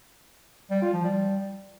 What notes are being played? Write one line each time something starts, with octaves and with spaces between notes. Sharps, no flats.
G3
F4
F3
G3